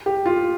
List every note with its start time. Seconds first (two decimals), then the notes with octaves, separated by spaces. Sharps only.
0.06 G4
0.26 F4